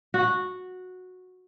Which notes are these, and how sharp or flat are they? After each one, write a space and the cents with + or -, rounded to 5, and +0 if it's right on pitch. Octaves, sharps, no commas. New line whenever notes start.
F#4 -10